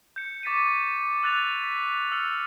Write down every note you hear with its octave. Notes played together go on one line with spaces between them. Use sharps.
G6 C#7
C#6 D6 A6 B6 C#7 D#7
E6 F#6 A6 F7
B6
E6 F6 C#7